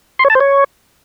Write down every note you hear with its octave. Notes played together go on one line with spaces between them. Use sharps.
C6
C#5
A5
C5
C#5